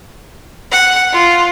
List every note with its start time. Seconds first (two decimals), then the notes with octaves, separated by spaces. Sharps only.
0.72 F#5
1.13 F4